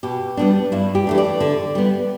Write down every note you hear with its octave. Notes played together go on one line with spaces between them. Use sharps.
B2 G4
G3 B3 D4
G2 E4
G4
E3 A3 D4
D5
D3
G3 B3